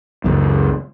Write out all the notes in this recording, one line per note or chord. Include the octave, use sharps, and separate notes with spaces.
C#2 F#2